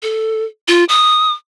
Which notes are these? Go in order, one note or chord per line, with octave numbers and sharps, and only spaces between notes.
A4
F4
D#6